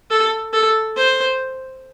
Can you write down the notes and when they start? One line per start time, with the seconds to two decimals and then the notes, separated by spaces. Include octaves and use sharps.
0.10 A4
0.53 A4
0.96 C5